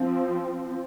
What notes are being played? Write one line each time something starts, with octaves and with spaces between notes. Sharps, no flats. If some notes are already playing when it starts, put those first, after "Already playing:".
Already playing: F3 C4